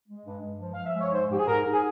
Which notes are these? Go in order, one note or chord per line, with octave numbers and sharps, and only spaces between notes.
G#3
G2
G2
F3
F3 F5
E5
G#3
C#5
G#2 C5
G#2 G4
G#4
G#2 A#4
G#2
G#4